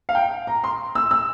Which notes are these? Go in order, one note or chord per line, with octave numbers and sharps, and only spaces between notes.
F5
G5
A#5
C6
E6
E6